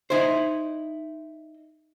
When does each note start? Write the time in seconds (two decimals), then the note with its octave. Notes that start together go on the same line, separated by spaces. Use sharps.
0.10 D#4 E4 C5